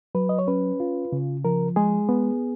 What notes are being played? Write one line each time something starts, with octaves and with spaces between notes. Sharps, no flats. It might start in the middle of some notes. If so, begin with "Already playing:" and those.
F#3 B4
D#5
C#5
C#4 B4
F4
C#3
F3 A#4
G#3 G#4
B3